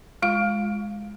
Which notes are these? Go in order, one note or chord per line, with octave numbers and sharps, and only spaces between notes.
G#3 F4 F5